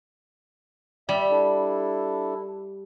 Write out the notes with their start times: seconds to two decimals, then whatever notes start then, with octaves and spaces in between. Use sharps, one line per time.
1.09 G3 E5
1.31 D4 E4 A4